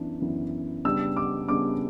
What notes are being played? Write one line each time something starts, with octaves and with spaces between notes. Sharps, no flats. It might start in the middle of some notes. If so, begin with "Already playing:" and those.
Already playing: F#2 E3 B3 D4
F#2 E3 B3 D4
C#3 G3 B3 D4 E6
D6
C#3 G3 B3 D4 D6